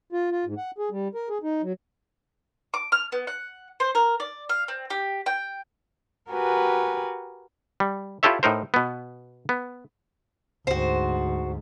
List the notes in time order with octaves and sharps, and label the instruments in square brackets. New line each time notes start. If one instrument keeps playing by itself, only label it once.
[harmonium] F4
F4
G#2
F#5
G#4
G3
A#4
G#4
D#4
F#3
[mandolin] D6
F6
B3
F#5
C5
A#4
D5
F5
C4
G4
G5
[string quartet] F#4 G4 A#4 B4 G#5
[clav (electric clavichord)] G3
E4 F4 G4 A4 C#5 E5
A2 D#4 A#4 C5
B2 B3
B3
[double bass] D2 G#2 [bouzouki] F#4 C5